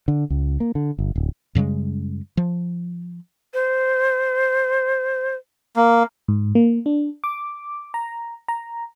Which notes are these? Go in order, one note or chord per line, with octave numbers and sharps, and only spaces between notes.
D3
C#2
A#3
D3
G1
D1
F#2 C#3 G3 G#3
F3
C5
A#3
G#2
A#3
D4
D6
A#5
A#5